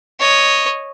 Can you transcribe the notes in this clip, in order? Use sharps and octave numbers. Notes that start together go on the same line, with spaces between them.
C#5 D#5